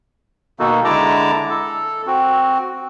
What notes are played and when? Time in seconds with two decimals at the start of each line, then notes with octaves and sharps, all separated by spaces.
0.59 B2 D#3 A#3 D#4 F#4 A4
0.85 D3 G#3 E4 A5 A#5 D6
1.50 A4
2.07 C4 F#4